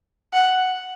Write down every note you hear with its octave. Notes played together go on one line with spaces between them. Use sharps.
F#5